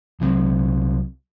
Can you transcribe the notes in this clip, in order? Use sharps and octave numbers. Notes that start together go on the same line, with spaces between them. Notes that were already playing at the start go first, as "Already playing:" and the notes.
C2 F#3 C4